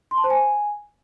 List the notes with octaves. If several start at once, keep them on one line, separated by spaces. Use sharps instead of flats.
C6
A5
C5
G#5